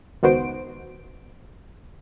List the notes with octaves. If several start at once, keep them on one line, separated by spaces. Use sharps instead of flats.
C#2 D#3 B3 F#4 C5 D7